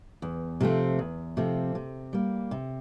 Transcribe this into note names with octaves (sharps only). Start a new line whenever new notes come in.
E2
C3 F3 A3 C4
E2
C3 F3 A3 C4
C3
G3 A#3
C3